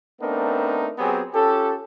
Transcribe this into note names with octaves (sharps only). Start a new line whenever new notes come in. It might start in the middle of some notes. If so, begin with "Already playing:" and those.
A3 B3 C4 D4 D#4 A#4
F#3 B3 C4 G4 G#4
C#4 F4 G4 A4